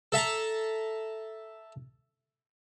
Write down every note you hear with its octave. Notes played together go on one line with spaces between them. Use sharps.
A4 E5 A5 A#5